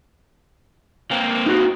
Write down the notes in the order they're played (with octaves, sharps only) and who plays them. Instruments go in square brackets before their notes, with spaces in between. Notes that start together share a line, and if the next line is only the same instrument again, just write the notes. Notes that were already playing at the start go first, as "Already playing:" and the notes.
[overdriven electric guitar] A#3 C4
[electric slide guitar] D#4 F#4